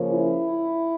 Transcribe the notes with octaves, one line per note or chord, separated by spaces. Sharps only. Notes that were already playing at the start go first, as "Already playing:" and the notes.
Already playing: C#3 F3 A#3 C#4
E4